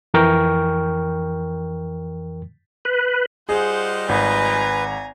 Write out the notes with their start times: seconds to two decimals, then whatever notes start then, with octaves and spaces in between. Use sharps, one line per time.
0.14 F2 E3 A#4 G5 C#6 F6
2.85 B4
3.49 G3 F4 G#4 C5 D#5 F#5
4.09 G#1 B4 G#5 A#5